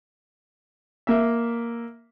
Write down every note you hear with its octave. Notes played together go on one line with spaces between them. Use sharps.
A#3 E5